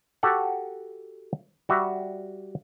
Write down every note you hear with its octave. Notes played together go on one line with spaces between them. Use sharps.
F#4 G4 A4 F#5
G3 F#4 E5